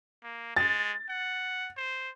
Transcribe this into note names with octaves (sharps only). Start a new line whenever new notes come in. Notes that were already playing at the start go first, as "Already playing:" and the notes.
A#3
G#3 A6
F#5
C5